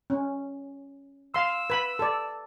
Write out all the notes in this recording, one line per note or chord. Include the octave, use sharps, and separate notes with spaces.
C#4
F5 C6 E6
B4 B5
A4 D5